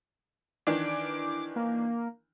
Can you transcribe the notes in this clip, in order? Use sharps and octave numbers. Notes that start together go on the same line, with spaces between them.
D#3 E3 D4 D6
A#3